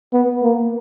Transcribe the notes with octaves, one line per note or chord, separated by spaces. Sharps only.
B3
A#3